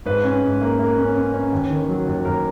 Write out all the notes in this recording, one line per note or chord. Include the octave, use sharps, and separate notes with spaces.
G#2 B4
C#4
G#2
A#3
A#3
C#4
C#4
C#4
D#2
D#3
F#3
D#2
D#2 A#4